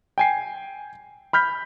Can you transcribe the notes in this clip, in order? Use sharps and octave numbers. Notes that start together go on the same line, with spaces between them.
G5 G#5 C7
B5 F6 G6 B6